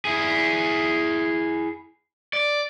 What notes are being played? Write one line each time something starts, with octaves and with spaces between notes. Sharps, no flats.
E4 G#4
D5